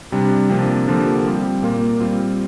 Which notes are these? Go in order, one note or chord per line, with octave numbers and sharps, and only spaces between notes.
C3 G3 D4
C3 F3 A#3 D4
D3 F3 A#3 G4
G3 C4 F4
A#2 A#3 F4
G3 C4 F4